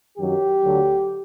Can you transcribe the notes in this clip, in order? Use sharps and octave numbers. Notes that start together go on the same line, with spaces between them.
F#2 D#3 F#3 G4
D2 D3 F#3